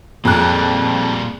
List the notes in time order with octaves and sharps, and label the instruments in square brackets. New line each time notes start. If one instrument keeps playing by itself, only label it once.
[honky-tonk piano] F2 F#6 [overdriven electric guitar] A#2 G3 [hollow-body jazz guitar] C4 G#4 A#5